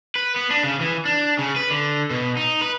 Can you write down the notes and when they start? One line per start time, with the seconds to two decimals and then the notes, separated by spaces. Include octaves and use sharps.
0.15 B4
0.36 B3
0.50 D4
0.64 C#3
0.81 E3
1.05 D4
1.39 C#3
1.56 B4
1.70 D3
2.11 B2
2.37 D#4
2.61 B4